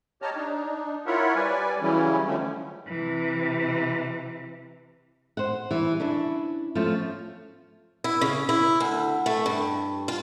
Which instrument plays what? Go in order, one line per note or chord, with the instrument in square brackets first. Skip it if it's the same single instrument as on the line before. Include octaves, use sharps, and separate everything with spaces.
[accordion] G4 C#5 D#5 A5 A#5 F6
D4 D#4
E4 F4 A#4 C#5 E5 F#5
G3 B4 D5 G#5
C#3 E3 F#3 G3 C#4 E4
D3 D#3 F3 A3 C#4
[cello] C3 E3
[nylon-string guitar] C5 F#5
E3 G3
C#4 D4 E4
F3 A3 C#4 F4
[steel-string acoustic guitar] E4
C#3
E4
D2
A3
G2
F4